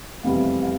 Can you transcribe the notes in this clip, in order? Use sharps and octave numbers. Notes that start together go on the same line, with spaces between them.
F1 E2 C3 E3 G3 F5
F5